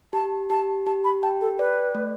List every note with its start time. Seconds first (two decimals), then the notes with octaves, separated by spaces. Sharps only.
0.13 G4 A5
0.50 G4 A5
0.86 G4 A5
1.04 B5
1.23 G5 A5
1.41 A4
1.59 B4 D5
1.95 A3